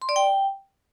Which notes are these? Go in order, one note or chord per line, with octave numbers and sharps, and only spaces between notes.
C6
D5
G5